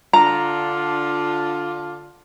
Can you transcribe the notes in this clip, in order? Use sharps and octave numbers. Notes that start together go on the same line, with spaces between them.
D3 D4 F4 A#5